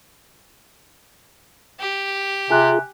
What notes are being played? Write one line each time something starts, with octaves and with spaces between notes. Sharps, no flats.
G4
C3 F4 G#4 G#5 F#6